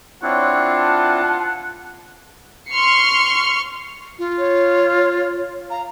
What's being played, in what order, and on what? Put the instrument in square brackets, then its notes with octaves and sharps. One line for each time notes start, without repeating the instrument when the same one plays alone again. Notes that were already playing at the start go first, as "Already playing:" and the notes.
[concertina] C4 D4 E4 [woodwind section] F4 [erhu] C#5 [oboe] F#5
[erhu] A5
[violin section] C6 C#6 F6 C7 C#7
[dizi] F4
[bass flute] C#5
[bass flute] F5 [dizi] A#5